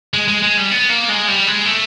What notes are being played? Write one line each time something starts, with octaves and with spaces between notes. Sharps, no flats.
G#3
G#3
G#3
G3
B3
A#3
G#3
G3
G#3
A3